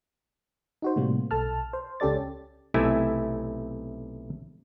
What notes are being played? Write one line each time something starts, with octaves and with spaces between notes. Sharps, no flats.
D#4 F#4 C5
A2 C3 G3 A#3
B1 A4 A5 F6
C5
C#2 C#4 G4 A4 D5 A6
B1 C3 A3 E4 E5 G#5